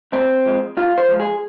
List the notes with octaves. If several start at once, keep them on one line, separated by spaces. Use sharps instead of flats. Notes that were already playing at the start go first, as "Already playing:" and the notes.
G2 C4
F3 G#3
G2 F4
C5
F3 G#3
G#4